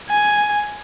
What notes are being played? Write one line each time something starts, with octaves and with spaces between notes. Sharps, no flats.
G#5